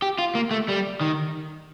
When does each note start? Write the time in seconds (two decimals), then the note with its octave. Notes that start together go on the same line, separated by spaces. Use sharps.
0.02 G4
0.19 F4
0.35 A#3
0.51 A3
0.68 G3
1.01 D#3